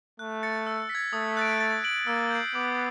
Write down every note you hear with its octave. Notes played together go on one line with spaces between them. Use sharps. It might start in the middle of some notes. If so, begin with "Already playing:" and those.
A3 F#6
A6 C#7
E6
B6
G#6
A3 D#6
F#6 A6 D7
A6
D7 F#7
A#3 E6
G6 C7
B3 D6